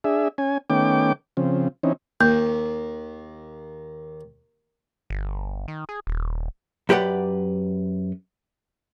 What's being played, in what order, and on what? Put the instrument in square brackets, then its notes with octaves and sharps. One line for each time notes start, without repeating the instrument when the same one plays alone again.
[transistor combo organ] D4 G#4 E5
C#4 G#5
D#3 A3 B3 C#4 G5 D6
C#3 F3 C4
E3 C4 C#4 D#4
[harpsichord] D#2 [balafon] A#3
[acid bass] G1
D#3
G#4
D#1
[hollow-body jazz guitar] F#2 G4 B4 D5 F#5